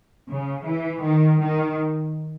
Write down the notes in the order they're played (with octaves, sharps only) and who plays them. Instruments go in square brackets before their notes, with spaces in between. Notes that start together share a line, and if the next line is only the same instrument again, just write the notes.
[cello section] C#3
E3
D#3
D#3